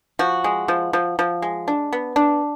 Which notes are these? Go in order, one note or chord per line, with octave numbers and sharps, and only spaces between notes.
F3 F#4
G#3
F3
F3
F3
G#3
D4
B3
D4